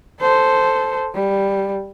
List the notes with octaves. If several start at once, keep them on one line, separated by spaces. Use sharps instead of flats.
A4 C5
G3